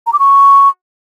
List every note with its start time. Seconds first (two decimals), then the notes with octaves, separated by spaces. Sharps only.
0.06 A#5
0.13 D6
0.19 C#6